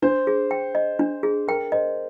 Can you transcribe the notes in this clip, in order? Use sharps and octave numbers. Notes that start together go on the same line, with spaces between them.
D4 C5
G#4
G5
D#5
D4
G#4
A#4 G5
C5 D#5